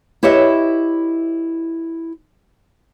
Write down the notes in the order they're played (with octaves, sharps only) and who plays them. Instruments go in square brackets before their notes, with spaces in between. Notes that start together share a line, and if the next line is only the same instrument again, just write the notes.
[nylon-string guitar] E4 G4 B4 C#5 D#5 E5